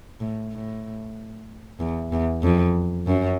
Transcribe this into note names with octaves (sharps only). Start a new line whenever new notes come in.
A2
A2
E2
E2
F2
F#2